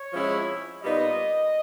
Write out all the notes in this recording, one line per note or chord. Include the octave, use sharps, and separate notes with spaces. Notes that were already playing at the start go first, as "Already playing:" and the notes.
Already playing: C#5
C3 F3 G#3 C#4 E4
A#2 G3 B3 D#4 D#5